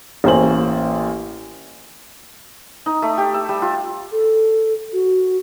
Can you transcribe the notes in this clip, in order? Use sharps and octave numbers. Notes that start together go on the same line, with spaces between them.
A1 A#3 C#4 C5 G#5 F#7
D#4
A3
G4
E5
G3
F4
A4
F#4